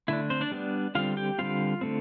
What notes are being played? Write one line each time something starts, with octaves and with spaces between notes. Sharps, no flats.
D3 A3 D4 E4
C4 C5
D4 D5
G3 B3 D4
D3 G3 C4 F4 F5
G4 G5
D3 G3 C4 F4 F5
D3 A3 C4